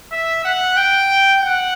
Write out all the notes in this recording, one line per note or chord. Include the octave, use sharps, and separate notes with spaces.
E5
F#5
G5
F#5